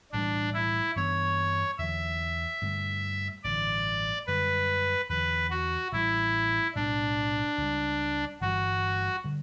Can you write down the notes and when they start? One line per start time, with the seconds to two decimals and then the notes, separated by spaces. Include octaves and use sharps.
0.12 B1 A2 E3 G3 D4
0.54 E4
0.96 G2 E3 B3 D4 C#5
1.78 E2 D3 F#3 E5
2.62 G2 D3 A3
3.44 A1 G2 D3 D5
4.27 F#2 D3 G3 B4
5.09 E2 D3 F#3 B4
5.51 F#4
5.92 A1 A2 G3 E4
6.75 B1 A2 G3 D4
7.58 C#2 C#3 G3
8.41 G1 G2 E3 G3 F#4
9.24 D3 G3